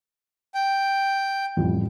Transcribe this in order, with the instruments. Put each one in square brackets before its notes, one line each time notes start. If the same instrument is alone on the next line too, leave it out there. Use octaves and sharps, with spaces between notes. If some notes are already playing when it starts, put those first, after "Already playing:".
[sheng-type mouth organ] G5
[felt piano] A1 F2 G3